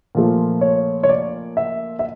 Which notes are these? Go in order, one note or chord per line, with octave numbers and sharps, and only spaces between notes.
A#2 F3 A3
C#5
C#5
D5
E5
E5